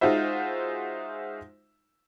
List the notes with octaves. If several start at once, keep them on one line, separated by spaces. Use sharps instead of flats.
G#3 D#4 F4 F#4 C5 E5